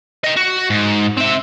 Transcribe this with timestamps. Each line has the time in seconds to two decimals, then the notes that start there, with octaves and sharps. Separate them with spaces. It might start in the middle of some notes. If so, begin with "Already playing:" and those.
0.24 D#5 G5
0.36 F#4
0.70 G#2
1.18 C4 E5